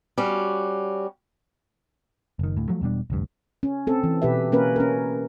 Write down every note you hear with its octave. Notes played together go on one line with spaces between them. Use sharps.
G3 C#4 F#4
F#1 D#3
D2 A2
F3 F#3 A3
E1 B2 G3 D4
F1 D2 G2
C#4
C4 A4
E3
B2 G4 B4 E5
A#3 C#4 A#4 B4
C#4 A#4